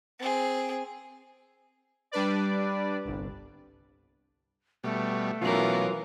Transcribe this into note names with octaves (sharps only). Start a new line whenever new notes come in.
C4 G#4
G3 D4 B4 D5
G1 C2
B2 G3 A3
B2 E3 F#3 A#3 C#4 F4